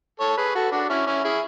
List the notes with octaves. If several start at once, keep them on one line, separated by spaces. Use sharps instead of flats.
A4 C#5
G#4 B4
F#4 A4
D4 F#4
C#4 E4
C#4 E4
E4 G#4